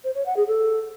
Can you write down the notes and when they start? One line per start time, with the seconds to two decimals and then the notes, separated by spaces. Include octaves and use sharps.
0.04 C5
0.15 C#5
0.26 F#5
0.37 G#4
0.47 A4